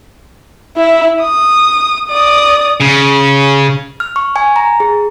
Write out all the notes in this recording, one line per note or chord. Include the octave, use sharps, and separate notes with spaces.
E4 E5
D#6
D5 D#6
C#3
F6
C#6
G#5
A#5
G#4